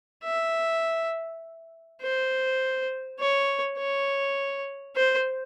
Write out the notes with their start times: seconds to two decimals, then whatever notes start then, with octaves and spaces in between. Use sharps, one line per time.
0.24 E5
2.02 C5
3.19 C#5
3.78 C#5
4.96 C5